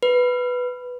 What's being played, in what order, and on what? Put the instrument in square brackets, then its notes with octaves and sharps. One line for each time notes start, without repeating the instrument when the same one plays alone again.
[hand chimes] B4